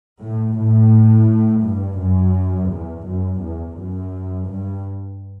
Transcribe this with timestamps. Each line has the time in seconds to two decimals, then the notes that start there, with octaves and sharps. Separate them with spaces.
0.21 A2
0.57 A2
1.64 G2
2.00 F#2
2.71 E2
3.07 F#2
3.42 E2
3.79 F#2
4.49 G2